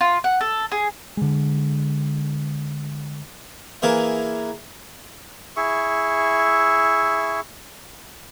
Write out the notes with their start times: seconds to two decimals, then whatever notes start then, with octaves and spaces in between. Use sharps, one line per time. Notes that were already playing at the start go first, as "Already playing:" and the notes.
0.01 F4
0.24 F#5
0.41 A4
0.72 G#4
1.17 D3 G#3
3.82 E3 A#3 G#4 A#4 E5
5.57 E4 G#4 E5 C#6